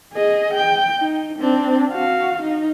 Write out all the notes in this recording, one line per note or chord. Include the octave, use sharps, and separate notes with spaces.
G#4 D#5
G5
D#4
C4 D4
F#4 F5
D#4